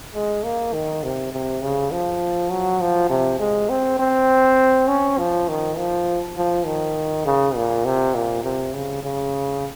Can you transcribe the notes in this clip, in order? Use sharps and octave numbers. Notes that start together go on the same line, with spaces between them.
G#3
A#3
D#3
C3
C3
C#3
F3
F#3
F3
C3
G#3
C4
C4
C#4
F3
D#3
F3
F3
D#3
C#3
A#2
C3
A#2
C3
C#3
C#3